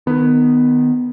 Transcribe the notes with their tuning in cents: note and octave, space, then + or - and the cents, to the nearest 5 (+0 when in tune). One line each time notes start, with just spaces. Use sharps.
D#3 -15 B3 +10